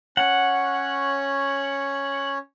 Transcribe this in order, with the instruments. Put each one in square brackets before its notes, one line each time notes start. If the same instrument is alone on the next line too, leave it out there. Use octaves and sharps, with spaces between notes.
[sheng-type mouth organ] C#4 C#5 [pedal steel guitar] F#5